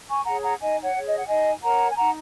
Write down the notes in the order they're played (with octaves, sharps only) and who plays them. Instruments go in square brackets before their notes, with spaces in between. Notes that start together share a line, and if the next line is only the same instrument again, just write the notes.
[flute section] G#5 C#6
G#4 C#5 F#5 A#5
F#5 A#5
D#4 D#5 G#5
C#5 F#5
G#4 C#5
D#5
F#5
D#4 D#5 G#5
A#4 C#5 F#5 A#5
G#5
D#4 F#5 A#5